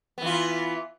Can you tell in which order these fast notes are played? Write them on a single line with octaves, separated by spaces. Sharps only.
B3 E3 F4